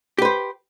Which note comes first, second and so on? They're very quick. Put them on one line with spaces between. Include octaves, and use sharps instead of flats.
G4 B4 C5